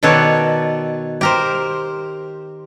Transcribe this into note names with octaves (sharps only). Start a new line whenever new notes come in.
B2 D#3 A4 B4 C#5 D5
G4 A#4 C5